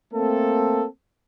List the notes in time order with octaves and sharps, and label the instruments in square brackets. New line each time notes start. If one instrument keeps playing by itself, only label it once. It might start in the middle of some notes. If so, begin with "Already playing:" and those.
[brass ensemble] A3 A#3 C4 A4